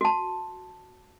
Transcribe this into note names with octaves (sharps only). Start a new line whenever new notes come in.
F#4 A5